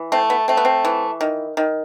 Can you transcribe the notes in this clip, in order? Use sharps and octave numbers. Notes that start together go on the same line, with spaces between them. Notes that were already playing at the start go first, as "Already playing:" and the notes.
Already playing: E3
A3 C4
B3
A3 C4
B3
C4
E3
D#3
D#3